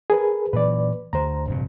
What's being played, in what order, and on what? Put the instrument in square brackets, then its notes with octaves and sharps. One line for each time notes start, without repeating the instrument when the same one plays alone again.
[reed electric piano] G#4 A#4 B4
[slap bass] A#2 E3 F#3 [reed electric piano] B4 D5
[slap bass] D2 [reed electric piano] C5 A#5
[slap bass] F1 G2 A#2